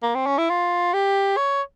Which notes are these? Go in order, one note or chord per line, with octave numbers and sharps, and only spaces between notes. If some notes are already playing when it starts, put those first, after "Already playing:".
A#3
C4
C#4
E4
F4
G4
C#5